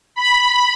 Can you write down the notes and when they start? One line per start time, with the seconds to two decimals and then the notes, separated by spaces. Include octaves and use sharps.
0.15 B5